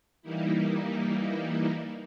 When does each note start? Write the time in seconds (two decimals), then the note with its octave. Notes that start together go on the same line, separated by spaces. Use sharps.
0.22 E3 G3 A#3 D#4 E4